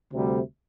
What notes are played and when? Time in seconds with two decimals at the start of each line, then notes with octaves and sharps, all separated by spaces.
0.13 D2 C3 G3